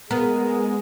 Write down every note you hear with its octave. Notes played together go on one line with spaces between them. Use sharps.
G#3 B3 A#4